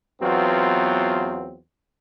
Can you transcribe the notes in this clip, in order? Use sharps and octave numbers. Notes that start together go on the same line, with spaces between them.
E2 F#3 B3 C4 F4 F#4